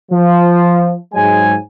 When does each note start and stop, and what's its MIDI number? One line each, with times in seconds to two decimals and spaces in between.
0.11 0.95 53
1.14 1.55 44
1.14 1.55 54
1.14 1.55 56
1.14 1.55 80